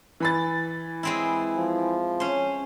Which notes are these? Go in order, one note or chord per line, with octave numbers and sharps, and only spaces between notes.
E3 B5 A6
G#3 C4 E4
F3
C#4 C5